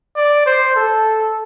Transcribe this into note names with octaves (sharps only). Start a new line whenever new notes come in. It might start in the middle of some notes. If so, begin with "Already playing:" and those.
D5
C5
A4